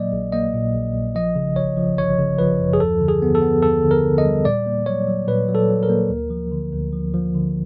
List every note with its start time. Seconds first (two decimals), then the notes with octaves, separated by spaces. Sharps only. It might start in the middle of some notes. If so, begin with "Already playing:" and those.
Already playing: A#2 F#3 A#3 D5 D#5
0.12 A#1
0.32 A#3 D#5
0.54 A#2
0.74 A#1
0.95 A#1
1.15 F3 D#5
1.36 C#3
1.56 G1 C#5
1.77 F3
1.98 G1 C#5
2.18 C#3
2.39 F3 B4
2.60 F#2
2.73 G#4
2.80 D#2 A4
3.00 D3
3.08 G#4
3.22 B3
3.35 A4
3.42 B3
3.62 D#2 A4
3.83 D3
3.91 A#4
4.04 D3
4.18 D#5
4.24 G3
4.45 A#2 D5
4.66 A#3
4.86 F#3 C#5
5.07 F#3
5.28 A#2 B4
5.48 F#3
5.55 A4
5.70 F#3
5.83 A#4
5.89 A#3
6.10 D2
6.30 F3
6.52 D3
6.72 D2
6.93 F3
7.14 F3
7.35 D3